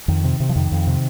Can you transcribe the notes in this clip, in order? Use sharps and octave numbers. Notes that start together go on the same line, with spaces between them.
F2 D#3
C3
C3
F3
F2 D#3
F2
C3